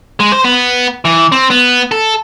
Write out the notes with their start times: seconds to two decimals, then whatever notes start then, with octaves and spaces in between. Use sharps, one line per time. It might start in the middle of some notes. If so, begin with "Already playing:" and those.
0.20 G#3
0.32 C5
0.44 B3
1.05 E3
1.32 C4
1.50 B3
1.92 A4